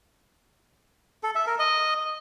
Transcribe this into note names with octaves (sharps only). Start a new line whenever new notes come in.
A4
E5
A#4
D#5